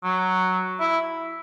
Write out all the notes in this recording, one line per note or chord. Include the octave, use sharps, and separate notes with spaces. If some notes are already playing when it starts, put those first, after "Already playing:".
F#3
E4